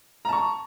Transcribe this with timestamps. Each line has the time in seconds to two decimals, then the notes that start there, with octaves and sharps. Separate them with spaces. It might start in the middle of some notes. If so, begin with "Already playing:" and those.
0.25 A#5
0.29 A5
0.33 C#6